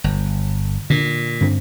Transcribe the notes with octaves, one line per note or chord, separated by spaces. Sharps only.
G1
A#2 D3
G2 D3 C4